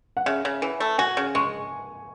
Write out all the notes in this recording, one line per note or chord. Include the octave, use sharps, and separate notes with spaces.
F#5
C#3 E5
C#3
E3
A3
F#4 G#5
C#3
G#3 C#6